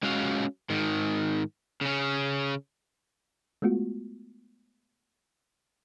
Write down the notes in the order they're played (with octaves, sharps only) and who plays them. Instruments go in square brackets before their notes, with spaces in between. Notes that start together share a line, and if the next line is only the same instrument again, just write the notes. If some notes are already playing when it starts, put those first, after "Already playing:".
[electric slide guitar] G#3 C#4 F#4 F5
G#2 D#3
C#3 C#4
[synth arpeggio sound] G#3 A3 B3 F4 F#4